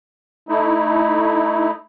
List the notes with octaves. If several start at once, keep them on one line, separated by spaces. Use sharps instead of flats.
A3 D#4 E4